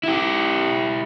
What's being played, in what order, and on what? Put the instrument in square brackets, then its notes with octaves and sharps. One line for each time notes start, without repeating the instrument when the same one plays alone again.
[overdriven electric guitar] E4 G4